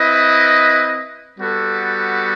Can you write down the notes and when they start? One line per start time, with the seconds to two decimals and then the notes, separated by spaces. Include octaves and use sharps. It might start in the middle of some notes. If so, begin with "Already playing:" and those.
Already playing: C4 E4 B4 D#5
1.37 G3 B3 F#4 A4